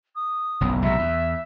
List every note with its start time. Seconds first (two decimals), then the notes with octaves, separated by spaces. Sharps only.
0.15 D#6
0.61 F#1 B1
0.82 B1 G#2 C3 E5
0.99 E2